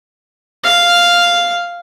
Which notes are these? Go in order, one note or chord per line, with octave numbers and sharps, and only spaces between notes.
F5